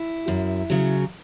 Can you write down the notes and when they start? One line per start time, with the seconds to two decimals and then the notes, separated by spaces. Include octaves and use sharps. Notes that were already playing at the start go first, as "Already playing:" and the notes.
Already playing: E4
0.28 F#2
0.70 C#3 F#3